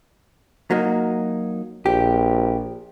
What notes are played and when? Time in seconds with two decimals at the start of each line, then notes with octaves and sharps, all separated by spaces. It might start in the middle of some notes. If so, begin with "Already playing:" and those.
0.71 F#3 A#3 D#4
1.86 A#1 G4